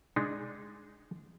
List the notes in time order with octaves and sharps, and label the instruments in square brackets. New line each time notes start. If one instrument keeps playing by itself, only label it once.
[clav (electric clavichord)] G#3 D4 D#4